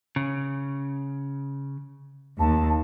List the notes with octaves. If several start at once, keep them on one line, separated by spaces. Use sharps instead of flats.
C#3
D#2 A5